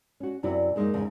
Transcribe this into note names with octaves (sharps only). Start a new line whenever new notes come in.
C#4 F#4
F#2 C3 E4 F#4 D5
F#2 G#3 A#3 C#4 D#4
E2 G#2 C#3 G#3 C#4 D#5